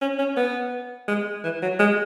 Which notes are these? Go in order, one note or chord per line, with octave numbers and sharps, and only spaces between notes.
C#4
C#4
B3
G#3
E3
F#3
G#3